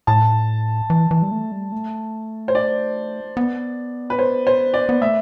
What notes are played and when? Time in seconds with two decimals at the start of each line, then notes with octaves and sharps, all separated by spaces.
0.07 A2 A5
0.90 E3
1.11 E3
1.22 G3
1.31 A3
1.52 G3
1.72 A3
2.48 C5
2.55 D5
3.37 B3
4.10 B4
4.19 C5
4.47 C5
4.74 D5
4.89 B3
5.01 A3 E5